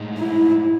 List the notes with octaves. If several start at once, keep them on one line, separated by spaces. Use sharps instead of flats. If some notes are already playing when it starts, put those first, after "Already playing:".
Already playing: A2 G#3 D#4
E4